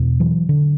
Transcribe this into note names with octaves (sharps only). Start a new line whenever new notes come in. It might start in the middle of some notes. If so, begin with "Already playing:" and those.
Already playing: E2 B2
E3 F#3
D3